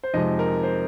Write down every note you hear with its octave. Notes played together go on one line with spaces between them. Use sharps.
C5
F2 C3 G#3 D#4 D#5
A#4
C5